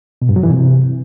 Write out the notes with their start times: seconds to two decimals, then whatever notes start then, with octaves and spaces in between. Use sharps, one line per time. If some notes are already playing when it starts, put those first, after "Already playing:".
0.22 B2
0.29 G2
0.36 F#3
0.43 E3
0.51 C3